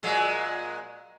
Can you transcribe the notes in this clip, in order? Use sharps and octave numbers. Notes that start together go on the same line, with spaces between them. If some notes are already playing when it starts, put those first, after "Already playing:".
A#2 F#3 G#3